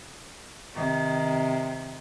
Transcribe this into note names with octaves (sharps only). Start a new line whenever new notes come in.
C3 D#3